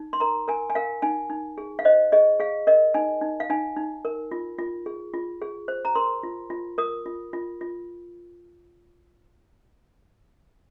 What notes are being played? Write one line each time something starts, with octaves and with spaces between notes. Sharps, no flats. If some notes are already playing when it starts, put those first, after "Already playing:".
Already playing: D#4
C6
A#4 A#5
A#4 G#5
G#5
A#4 F5
D#4 G#5
D#4
G#4
F5
C5 D#5
G#4 D#5
G#4 F5
A#4 D#5
D#4 G#5
D#4
F5
D#4 G#5
D#4
A#4
F4
F4
G#4
F4
G#4
C5
A#5
A#4 C6
F4
F4
A#4 D#6
F4
F4
F4